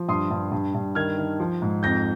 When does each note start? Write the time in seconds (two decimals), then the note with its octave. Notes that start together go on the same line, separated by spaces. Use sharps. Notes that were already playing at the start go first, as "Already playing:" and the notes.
Already playing: F3
0.09 G2 C6 D#6
0.31 G2
0.52 G2
0.75 G2
0.95 D#3 F6 G#6
1.18 D#3
1.40 F3
1.62 G#2
1.83 F2 G6 A#6